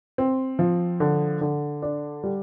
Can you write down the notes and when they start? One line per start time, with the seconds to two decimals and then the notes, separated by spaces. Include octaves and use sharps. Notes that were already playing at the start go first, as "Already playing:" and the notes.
0.18 C4
0.59 F3
1.00 D3
1.41 D3
1.82 D4
2.24 G3